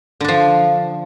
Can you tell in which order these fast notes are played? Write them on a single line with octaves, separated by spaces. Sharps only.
D3 D4 F3